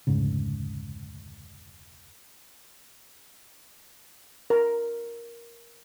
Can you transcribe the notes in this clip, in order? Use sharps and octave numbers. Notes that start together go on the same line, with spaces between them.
F1 D2 G#2 C#3
A#4